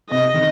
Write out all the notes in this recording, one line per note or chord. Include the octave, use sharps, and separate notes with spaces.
C3 D#5
D#3